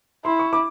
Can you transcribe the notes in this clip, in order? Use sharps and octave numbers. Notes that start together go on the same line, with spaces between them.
E4 C6
C#6
D6